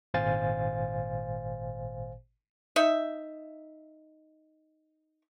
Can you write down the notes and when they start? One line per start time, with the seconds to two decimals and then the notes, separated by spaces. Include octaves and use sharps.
0.14 G#1 A#2 C5 F5 G#5 A6
2.76 D#4 E5